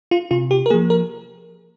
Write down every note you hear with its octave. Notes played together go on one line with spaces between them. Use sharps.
F4
C3 F4
G4
A#4
F3 A#3 G#4
A#4